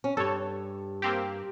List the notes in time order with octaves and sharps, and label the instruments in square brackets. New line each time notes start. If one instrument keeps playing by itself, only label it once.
[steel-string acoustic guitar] C#4
[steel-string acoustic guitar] G2 [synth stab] A4 C#5
[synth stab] A#3 C4 G4